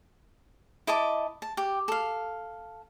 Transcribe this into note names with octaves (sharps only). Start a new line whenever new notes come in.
E4 D#5 A5 D6
A5
G4
A4 F5